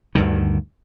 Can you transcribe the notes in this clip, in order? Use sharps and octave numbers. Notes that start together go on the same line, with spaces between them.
D2 G2 D3 D#3